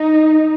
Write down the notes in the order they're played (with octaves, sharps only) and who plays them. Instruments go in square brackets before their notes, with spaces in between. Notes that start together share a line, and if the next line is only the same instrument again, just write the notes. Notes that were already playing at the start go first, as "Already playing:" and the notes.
Already playing: [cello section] D#4